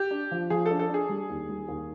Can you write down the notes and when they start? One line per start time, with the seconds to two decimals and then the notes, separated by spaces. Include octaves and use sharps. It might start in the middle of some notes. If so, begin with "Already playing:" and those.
Already playing: G4
0.11 D4
0.31 F3
0.50 F3 G#4
0.66 A4
0.71 D4
0.79 A4
0.89 D4 G#4
1.09 G3
1.30 D#2
1.49 G3
1.68 D#2